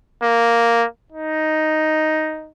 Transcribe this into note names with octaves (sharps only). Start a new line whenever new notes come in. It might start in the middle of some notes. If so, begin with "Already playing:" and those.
A#3
D#4